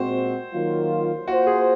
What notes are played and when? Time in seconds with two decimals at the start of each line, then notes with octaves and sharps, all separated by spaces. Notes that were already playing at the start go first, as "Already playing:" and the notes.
Already playing: A#2 G#3 C4 F#4 C5
0.52 D#3 F#3 A#3 F4
1.28 A#3 F4 F#4 C5
1.47 G#4